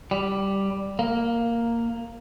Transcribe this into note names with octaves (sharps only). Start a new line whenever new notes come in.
G3
A#3